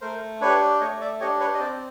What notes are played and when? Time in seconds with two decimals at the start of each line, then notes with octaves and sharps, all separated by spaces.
0.01 A3 A#4 C5
0.41 D4 G4 B4 C#5
0.80 A3 C#5 D#5
1.01 D5 E5
1.20 D4 G4 C#5 D#5
1.40 B4 C#5
1.54 D#5
1.60 C4 C5 D5